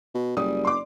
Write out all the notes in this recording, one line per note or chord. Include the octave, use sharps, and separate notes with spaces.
B2
F#1 G3 D#6
C6 D6